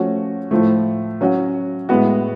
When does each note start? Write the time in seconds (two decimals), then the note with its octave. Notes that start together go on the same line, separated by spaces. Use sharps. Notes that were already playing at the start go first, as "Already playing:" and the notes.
Already playing: F3 A3 C#4 F#4
0.51 A2 F3 A3
1.21 F#3 C#4 F#4
1.89 A2 G#3 B3 F#4